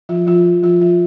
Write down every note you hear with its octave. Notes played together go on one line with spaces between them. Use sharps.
F3 F4
F3 F4
F3 F4
F3 F4